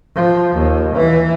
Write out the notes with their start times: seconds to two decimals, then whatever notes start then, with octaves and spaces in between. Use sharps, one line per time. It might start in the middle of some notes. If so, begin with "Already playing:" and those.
0.15 F3
0.55 D#2
0.95 E3